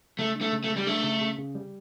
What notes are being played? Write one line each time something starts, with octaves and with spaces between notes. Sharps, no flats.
C#3 A3
D4
A3
C#3
A3
C#3
G3
A3 D4
C#3
C#3
C#3
G3